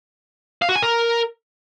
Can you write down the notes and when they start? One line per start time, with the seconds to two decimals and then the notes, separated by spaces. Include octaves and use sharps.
0.62 F5
0.69 F#4
0.76 G#5
0.83 A#4